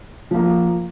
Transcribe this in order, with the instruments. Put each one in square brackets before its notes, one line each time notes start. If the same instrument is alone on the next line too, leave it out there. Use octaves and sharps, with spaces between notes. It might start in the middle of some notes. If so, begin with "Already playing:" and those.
[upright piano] F3 A#3